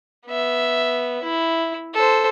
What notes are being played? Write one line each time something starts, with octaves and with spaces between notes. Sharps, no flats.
B3 E5
E4
A4 C5